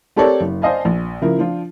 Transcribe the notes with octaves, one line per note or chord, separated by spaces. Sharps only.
C4 G4 A4 A#4 C#5 D5
F#1
C5 D5 D#5 F5 G#5 A5
A#1
C#3 F3 E4 A#4
F3 D4 F4